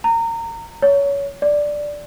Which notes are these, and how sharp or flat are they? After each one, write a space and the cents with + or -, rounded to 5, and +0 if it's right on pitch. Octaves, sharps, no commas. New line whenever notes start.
A#5 -25
C#5 +20
D5 +5